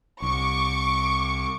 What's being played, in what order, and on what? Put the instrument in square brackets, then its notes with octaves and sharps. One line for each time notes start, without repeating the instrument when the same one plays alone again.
[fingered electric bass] C2 [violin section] C#6 D6